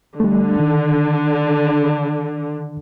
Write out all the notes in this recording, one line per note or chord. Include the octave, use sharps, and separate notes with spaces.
D3 G3 A3
D#3